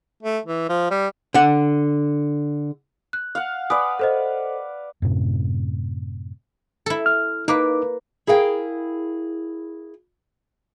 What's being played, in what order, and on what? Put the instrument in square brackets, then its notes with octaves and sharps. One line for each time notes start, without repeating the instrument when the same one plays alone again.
[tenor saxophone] A3
E3
F3
G3
[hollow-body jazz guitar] D3 F#5
[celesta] F#6
[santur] F5 F#5
[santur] B4 D5 [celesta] G#5 D#6
[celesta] A4 C5 D#5
[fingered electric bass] F#2 A2 C3
[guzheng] E4 A4
[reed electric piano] F6
[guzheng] A#3 B4 [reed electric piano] D#4 D6
[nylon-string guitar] E4 G#4 A#4 F5 G5